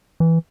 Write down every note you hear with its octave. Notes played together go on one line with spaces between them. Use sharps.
E3